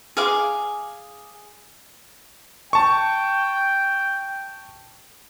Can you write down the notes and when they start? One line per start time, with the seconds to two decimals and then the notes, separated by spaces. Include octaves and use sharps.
0.17 G#4 F5 D6
2.73 G5 A5 C#6